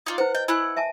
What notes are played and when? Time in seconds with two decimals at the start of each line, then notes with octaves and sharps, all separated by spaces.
0.06 D#4 F4 D5
0.18 E4 B4 C5 F#5
0.35 D#5 G5
0.48 E4 F#5 G#5 F#6
0.77 E5 G#5 A5